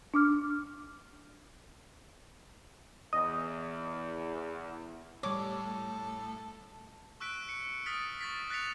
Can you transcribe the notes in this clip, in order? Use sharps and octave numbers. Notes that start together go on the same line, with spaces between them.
D4 D6 F6
E2 D#5
A2 G3 A4 C#5 D6
C#6 E6 F#6 B6 D7
C#7
D#6 F6 A6 B6 C#7 D7
C#6 A6 B6
F#6 A6 B6 C#7 F7